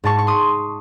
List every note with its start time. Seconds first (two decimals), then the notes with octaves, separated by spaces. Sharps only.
0.04 G#2 A5 C#6
0.18 C#6
0.27 C6 D#6